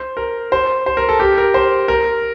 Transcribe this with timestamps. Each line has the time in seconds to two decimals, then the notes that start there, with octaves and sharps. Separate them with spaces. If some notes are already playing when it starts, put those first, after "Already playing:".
Already playing: C5
0.17 A#4
0.52 C5
0.86 C5
0.97 A#4
1.09 A4
1.20 G4
1.38 A#4
1.54 C5
1.88 A#4